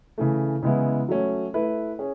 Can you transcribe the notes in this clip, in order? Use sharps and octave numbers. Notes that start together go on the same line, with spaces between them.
C#3 E3 A3
C#3 E3 G#3 B3 E4
F#3 A3 C#4
A3 E4 B4
C#4 G#4